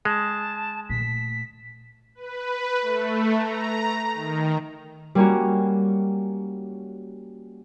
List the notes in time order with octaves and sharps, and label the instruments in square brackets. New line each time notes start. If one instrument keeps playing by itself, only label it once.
[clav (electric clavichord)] G#3 [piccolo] A5
[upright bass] A#2 A3 [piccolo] B6
[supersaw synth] B4
A3
A#5
D#3
[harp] G3 A#3 C#4 F#4